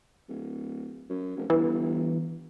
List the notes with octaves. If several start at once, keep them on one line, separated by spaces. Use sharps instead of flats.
D1
F#2
F1
G1 E3